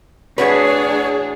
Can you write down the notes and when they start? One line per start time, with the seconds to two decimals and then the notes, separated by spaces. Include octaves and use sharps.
0.38 A2 D4 F#4 G#4 B4 C#5